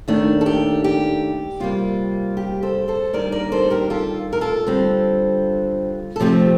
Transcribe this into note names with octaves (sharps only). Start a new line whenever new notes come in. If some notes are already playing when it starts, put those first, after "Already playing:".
D#2 D#3 A3 D4
A4
G4
G4
C3 G3 A#3 F4
G4
A4 C5
A4 C5
D#2 D#3 G3 D4 A#4 D5
A#4 D5
A4 C5
G4 A#4
F4 A4
A#4
F4 A4
D3 G3 C4
A4
C3 F3 A3 C4 G4